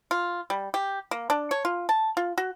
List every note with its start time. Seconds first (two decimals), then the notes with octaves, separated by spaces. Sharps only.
0.11 F4
0.50 G3
0.74 G4
1.11 A#3
1.30 D4
1.51 C#5
1.65 F4
1.89 A5
2.17 F4
2.38 F#4